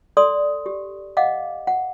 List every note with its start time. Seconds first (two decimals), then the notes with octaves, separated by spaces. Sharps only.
0.17 A4 D5 C6 D#6
0.66 G4
1.17 D#5 F5 F#5 D6
1.67 F#5